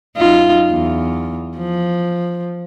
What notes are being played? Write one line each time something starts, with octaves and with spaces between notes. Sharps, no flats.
F#2 D#4 F4
E2
F3